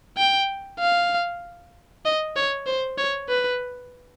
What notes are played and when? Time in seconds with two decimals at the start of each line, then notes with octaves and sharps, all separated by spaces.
0.18 G5
0.80 F5
2.05 D#5
2.36 C#5
2.66 C5
2.98 C#5
3.29 B4